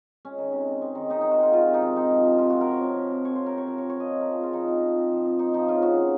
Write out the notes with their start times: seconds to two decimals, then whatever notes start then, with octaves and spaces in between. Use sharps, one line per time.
0.25 G#3 C#4
0.38 D#3
0.52 C3
0.68 C4
0.81 G#3
0.95 D#3
1.10 C3 D#4
1.21 C4 D#4
1.31 F#4
1.39 G#3 F4
1.52 D#3 F4
1.67 C3
1.74 D#4
1.82 C4
1.95 C4 D#4
2.11 F3
2.24 C3
2.38 C3 F4
2.50 C4 F#4
2.61 A#4
2.67 F3 C#5
2.81 C3
2.96 C3
3.11 C4
3.25 F3 C#5
3.36 C3 C5
3.46 A#4
3.53 C3 C#5
3.68 F3 A#4
3.78 C4 C#5
3.90 C#5
3.96 F3 D#5
4.11 C4
4.21 F3 A#4
4.32 G#4
4.39 C4 F4
4.53 F3 D#4
4.68 C4
4.82 F3
4.97 C4
5.11 F3
5.25 C4
5.39 A#3 D#4
5.54 F3 D#4
5.68 C#3 F4
5.82 C#3 F#4
5.97 A#3